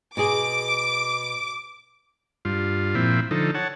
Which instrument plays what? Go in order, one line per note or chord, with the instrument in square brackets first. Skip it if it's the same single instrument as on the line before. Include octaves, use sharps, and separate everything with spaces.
[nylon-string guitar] B2 G#4 [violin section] D6
[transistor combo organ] G2 F4
A#2 F3 C4 E4
D3 F3 D#4 A4
C#5 F#5 A5